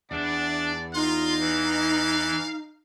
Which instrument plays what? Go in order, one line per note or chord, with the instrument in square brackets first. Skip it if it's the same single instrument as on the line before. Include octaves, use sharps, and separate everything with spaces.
[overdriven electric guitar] E2 [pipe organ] D4 [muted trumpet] D5
[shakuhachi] D#4 [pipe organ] F4 C6 [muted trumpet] F5
[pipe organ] E3